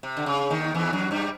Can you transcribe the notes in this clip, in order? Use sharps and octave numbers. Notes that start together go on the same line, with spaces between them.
C3
D3
C#3
D#2 D#3
E2 E3
F#2 F#3
G2 G3